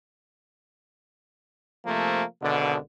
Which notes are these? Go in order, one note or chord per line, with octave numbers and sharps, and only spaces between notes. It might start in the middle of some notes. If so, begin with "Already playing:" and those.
C3 F3 A3 A#3
G#1 B2 D3